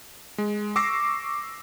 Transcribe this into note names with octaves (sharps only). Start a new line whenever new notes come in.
G#3
C#6 D6 E6 A#6 C7